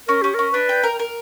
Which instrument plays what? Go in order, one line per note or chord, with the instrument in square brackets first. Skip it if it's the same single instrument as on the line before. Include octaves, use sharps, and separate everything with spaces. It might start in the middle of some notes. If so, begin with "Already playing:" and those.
[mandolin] C#4 [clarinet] A#4
[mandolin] C#4 [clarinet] G4
[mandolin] C#4 [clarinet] A#4
[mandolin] D4 [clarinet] B4
[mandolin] G5
A#4
A#4